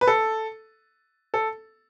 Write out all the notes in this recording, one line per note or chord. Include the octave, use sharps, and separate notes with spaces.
B4
A4
A4